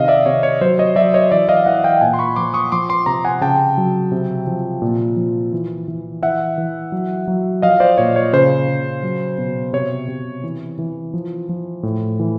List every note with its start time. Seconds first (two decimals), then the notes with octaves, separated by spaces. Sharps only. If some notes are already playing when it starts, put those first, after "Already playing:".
Already playing: C3 D#3 D#5 F5
0.08 D5 E5
0.26 C3 C#5
0.43 C#5
0.61 F#3 C5
0.79 C#5 D#5
0.96 F#3 D5 E5
1.14 C#5 D#5
1.31 E3 D5 E5
1.49 D#5 F5
1.66 E3 E5 F#5
1.84 F5 G5
2.01 A#2 F#5 G#5
2.14 C6
2.19 B5 C#6
2.36 F3 C6 D6
2.54 C#6 D#6
2.72 F3 C6 D6
2.89 C6 D6
3.06 C3 A#5 C6
3.25 F#5 G#5
3.41 C#3 G5 A5
3.78 F#3
4.12 C3
4.47 F3
4.82 A#2
5.17 F3
5.53 E3
5.88 E3
6.23 E3 E5 F#5
6.58 E3
6.92 F#3
7.28 F#3
7.62 F3 D#5 F5
7.80 C5 D5
7.98 A#2 C#5
8.16 C#5
8.33 C#3 C5
8.69 C#3
9.03 F#3
9.38 B2
9.73 C3 C#5
10.09 C3
10.44 E3
10.79 E3
11.14 F3
11.49 F3
11.83 A2
12.19 E3